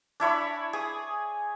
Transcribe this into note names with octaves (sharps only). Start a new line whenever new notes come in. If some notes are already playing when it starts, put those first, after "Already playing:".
D4 E4 C#5 B5
G#4 D#6